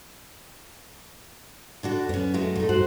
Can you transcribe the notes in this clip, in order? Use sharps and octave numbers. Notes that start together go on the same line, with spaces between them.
D3 D4 F#4
F#2 B3 C#4
G#3 A3 F#4
A3 D#4
G2 F#4 C5 F#6